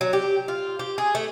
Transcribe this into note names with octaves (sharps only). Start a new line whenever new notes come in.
F#3
G4
F4
G4
G#4
A3